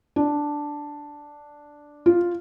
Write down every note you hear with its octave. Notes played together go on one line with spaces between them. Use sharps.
D4
F4